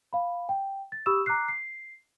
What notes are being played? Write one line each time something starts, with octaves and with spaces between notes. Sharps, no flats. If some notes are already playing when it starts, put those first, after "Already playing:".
F5 B5
G5
A6
G4 B5 C#6 D#6 E6 E7
A#5 D6 F6 F#6 C7
C7